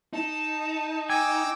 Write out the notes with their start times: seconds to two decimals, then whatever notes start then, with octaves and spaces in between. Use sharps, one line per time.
0.13 D#4 A5
1.10 G5 G#5 D6 E6